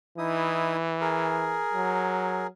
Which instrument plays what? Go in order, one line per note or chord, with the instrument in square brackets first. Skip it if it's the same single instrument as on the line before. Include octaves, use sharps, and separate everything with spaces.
[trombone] E3 [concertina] D#4 E4 D#6
[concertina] G#4 A#4
[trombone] F#3